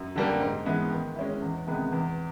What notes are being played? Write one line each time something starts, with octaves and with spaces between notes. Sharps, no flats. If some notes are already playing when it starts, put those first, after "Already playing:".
Already playing: F#2
D3 G3 A#3
G#2
E3 G#3 B3
D#3
G#3 C#4 E4
E2
C3 D#3 G#3 B3
E2